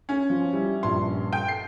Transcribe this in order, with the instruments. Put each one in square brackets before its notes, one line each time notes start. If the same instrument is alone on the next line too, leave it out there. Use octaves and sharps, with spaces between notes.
[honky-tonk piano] C#4
[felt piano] F3
G3 E4
A#1 G2 C6
[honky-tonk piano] G5
C7